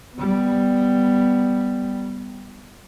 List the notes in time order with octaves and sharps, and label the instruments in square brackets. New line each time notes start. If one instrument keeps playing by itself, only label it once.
[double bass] G3 B3